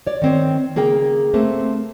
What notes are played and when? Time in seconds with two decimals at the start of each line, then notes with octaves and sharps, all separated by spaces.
0.07 C#5 D5
0.22 D#3 C4 C#5
0.76 C#3 A#3 G#4 A#4 G5
1.34 A3 A#3 C4